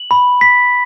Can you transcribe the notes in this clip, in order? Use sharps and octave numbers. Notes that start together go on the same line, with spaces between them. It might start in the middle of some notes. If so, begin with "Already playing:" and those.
Already playing: F#7
B5
B6